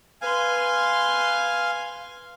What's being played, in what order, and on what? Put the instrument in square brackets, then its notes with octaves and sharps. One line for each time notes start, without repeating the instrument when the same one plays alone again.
[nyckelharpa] B4 C6 [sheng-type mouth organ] F5 G#5